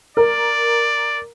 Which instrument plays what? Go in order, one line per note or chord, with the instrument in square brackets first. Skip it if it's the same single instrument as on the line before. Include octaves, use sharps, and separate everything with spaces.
[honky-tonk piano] A#4 [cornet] D5